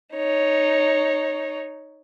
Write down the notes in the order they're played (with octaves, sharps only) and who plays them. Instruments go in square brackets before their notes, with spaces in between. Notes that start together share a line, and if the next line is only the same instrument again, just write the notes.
[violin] D#4 C#5